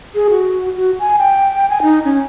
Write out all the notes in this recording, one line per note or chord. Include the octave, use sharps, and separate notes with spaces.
G#4
F#4
F#4
G#5
G5
G#5
D#4
C#4